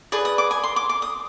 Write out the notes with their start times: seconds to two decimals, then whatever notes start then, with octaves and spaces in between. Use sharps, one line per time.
0.12 G#4 B4 D5 D#6
0.25 D#6
0.38 D6
0.51 G#5
0.64 C6
0.76 D6
0.89 D6
1.02 D#6